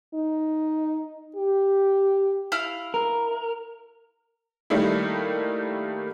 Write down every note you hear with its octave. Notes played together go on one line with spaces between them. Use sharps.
D#4
G4
E4 F5 F6
A#4
D#3 G3 A3 A#3 D#4 E4